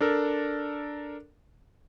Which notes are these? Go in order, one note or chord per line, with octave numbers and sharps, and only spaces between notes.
D4 A4 A#4